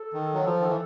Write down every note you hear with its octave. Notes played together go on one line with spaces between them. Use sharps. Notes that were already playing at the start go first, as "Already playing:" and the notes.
Already playing: A4
D#3
F#3
F3
D#3
E3